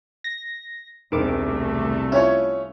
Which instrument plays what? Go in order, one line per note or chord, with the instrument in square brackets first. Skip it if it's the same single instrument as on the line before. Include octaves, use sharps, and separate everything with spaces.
[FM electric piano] A#6
[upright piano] E1 C4 [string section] C2 A3 [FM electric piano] D#3 D6
[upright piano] C#4 C#5 [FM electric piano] E4 F4